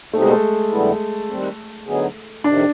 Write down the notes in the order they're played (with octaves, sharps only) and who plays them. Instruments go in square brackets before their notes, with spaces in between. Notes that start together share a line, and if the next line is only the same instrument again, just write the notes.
[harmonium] B2 G3 C4 D#4 [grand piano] A3
[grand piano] G#3
A3
[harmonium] F2 D3 G3 B3 E4
D#3 G3 C4
D3 F#3 B3 D#4 G#4
[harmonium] F2 C3 D#3 [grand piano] D4